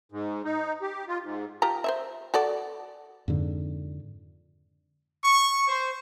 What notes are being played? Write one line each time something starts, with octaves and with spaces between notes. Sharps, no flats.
G#2
D#4
G4
F4
G#2
F4 G4 A#5
C5 C#5 E5
F#4 A4 D5
F2 G#2 D3
C#6
C5